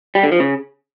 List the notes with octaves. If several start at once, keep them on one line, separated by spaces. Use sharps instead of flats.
G3
D3
F3
C#3